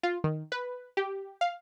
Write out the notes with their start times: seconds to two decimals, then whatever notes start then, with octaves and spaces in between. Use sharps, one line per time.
0.03 F4
0.24 D#3
0.52 B4
0.97 G4
1.41 F5